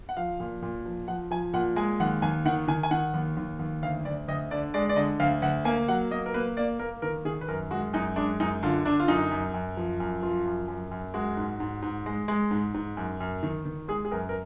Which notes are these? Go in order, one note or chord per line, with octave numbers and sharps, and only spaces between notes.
F#5
F3 F5
A#2
A#2
F3
F3 F#5
F3 G#5
A#2 F#5
G#3 G#5
D#2 F#5
D#2 G#5
D#3 F#5
D#3 G#5
G#5
D#3 F#5
D#2
D#2
D#2
D2 F5
D2 D5
D2 D#5
D3 D5
G#3 D5
D5
D3 D#5
D2 F5
D2 F#5
A#3 G#5
F#3 F#5
A#3 D#5
A#4
A#3 B4
A#3 D5
A#3 A#4
D#3 A#4
D#3 G#4
B4
F#2 A#4
G#3 F#4
F#2 D#4
G#3 D4
F#2 D#4
D3 F4
D3 D4
F4
F#2 D#4
F#2
F#2
F3
F#2
F3 F4
F#2
F#2
F#2
G#3 F#4
G#2
G#2
G#2
G#3
G#3
G#2
G#2
F#2
F#2
D#3
D#3
G#3 G#4
G#4
F#2 A#4
A#4